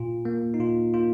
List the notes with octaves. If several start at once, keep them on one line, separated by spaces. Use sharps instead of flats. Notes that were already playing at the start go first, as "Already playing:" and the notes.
Already playing: A#2 F4
A#3
D#4
A#2 F4
A#3 F4